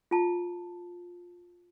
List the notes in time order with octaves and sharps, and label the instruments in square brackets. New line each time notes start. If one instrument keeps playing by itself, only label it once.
[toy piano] F4 A5